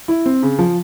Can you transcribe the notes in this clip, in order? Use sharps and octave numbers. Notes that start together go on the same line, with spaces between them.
E4
C4
C#3
F3